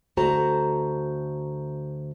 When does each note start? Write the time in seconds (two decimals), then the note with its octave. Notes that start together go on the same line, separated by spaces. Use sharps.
0.17 D2 A3 F#4 C5 A5 A#5